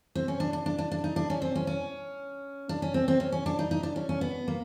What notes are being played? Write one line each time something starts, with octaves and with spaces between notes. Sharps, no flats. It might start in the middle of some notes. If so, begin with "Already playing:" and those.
C4
C#4
D4
D4
D4
D4
D4
D#4
D4
C#4
C4
C#4
C#4
D4
C#4
C4
C4
C#4
C#4
D4
D#4
D#4
D4
C#4
C#4
B3
A#3